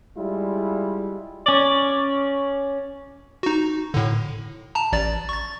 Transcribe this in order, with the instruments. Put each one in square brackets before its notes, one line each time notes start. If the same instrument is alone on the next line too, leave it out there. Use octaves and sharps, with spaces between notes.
[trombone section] G3 G#3 E4 F4
[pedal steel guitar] C#4 D5
[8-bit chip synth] D#4 F#4
A2 D3
A5 A#5
A1 D5 A6
C#6 A6